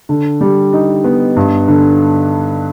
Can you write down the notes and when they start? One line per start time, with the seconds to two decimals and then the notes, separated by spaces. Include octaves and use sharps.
0.09 D3
0.41 G3
0.73 D#4
1.04 B3
1.36 G2
1.68 D3